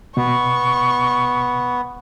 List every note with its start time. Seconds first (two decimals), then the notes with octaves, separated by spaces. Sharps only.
0.17 B2 B3 C#6